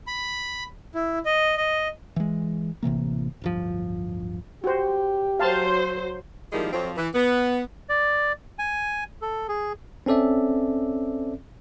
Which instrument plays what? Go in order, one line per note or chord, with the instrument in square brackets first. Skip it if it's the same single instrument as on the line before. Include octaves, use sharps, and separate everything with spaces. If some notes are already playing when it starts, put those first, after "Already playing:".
[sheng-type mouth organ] B5
E4
D#5
D#5
[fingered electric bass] E3 G#3
A1 C3 E3 A#3
D1 G1 F3
[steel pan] F#4 C5 [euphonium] G4
[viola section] F#3 C5 [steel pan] F5 A5 C6
[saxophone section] D#3 F3 G3 G#3 A#3 E4
F2 F3 F#3 C4
E3
B3
[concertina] D5
G#5
A4
G#4
[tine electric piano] C4 C#4 A4 D5 E5